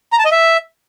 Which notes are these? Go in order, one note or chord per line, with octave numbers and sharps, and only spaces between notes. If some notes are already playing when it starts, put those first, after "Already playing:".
A#5
A5
D#5
E5